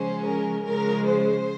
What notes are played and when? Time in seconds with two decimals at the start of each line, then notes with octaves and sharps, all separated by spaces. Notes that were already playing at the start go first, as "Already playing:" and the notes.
Already playing: C#3 F3 G#3 C#4 C5
0.26 A#4
0.67 C#3 F3 G#3 A#4
1.09 C5